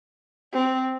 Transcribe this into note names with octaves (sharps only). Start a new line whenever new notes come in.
C4